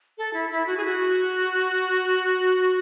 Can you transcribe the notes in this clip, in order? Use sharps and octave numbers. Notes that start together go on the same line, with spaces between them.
A4
E4
E4
F#4
G#4
F#4